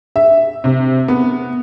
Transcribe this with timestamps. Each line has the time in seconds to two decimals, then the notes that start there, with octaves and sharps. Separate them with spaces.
0.16 E5
0.64 C3
1.08 B3